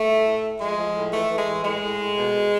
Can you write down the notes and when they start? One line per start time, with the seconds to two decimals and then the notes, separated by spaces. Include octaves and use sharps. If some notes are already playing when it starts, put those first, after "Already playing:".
Already playing: A3
0.09 A2
0.25 A2
0.43 A2
0.60 F3 G#3
0.77 F3
0.96 A2
1.12 E3 A3
1.31 E3
1.38 G#3
1.47 A2
1.64 A2 G#3
1.82 A2
1.99 A2
2.16 B2
2.34 B2